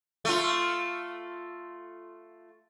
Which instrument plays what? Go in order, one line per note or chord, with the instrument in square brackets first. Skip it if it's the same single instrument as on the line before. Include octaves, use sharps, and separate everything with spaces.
[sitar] A3 F4